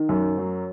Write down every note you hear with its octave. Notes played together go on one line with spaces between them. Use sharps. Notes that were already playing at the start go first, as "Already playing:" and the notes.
Already playing: D#3
F#2
F#3